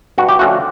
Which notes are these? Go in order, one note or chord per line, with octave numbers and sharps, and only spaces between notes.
G2 F#4
G4
D3 F3 A3 C#4 F#4